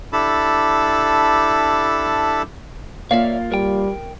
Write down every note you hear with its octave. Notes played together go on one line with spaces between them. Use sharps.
D4 E4 G4 A4 A5 B5
A#3 F4 C#5 D5 E5 F5
G3 A#4 G5